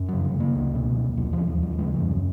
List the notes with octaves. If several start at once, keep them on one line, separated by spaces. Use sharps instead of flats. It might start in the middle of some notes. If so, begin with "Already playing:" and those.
Already playing: F#2
C#3 F#3
F#3
C#3
A#3
C#2
B2
C#2
D#2 F#3
D#2 F3
F3
D#2 F#3
C#3 G#3
F3
F#2
F#3